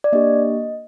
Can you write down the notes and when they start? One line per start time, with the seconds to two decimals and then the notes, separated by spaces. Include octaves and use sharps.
0.04 D5
0.12 A#3 D4 G4 D#5